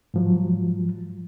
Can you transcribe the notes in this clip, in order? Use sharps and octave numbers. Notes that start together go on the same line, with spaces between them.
G#2 F3 F#3